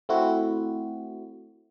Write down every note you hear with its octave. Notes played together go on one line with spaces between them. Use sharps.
A3 C4 E4 F#4